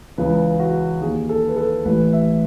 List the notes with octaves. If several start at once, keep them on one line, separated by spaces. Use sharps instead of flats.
C#2 C#3 E3 B4
F#4
D#2 D#3 G#4
A4
B4
A4
A1 A2 E3 B4
E5